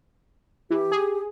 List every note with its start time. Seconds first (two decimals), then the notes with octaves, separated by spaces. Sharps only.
0.70 E3 G4
0.91 G#4